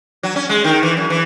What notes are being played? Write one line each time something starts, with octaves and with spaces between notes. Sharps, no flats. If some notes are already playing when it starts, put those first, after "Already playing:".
F#3
C#4
G#3
D#3
E3
F#2
E3